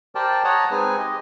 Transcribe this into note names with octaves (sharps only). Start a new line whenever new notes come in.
G4 A#4 C5 D5 G5 A5
C#5 D#5 F#5 A5 A#5
G#3 C4 D#4 G#4 B4 G#5
G4 D#5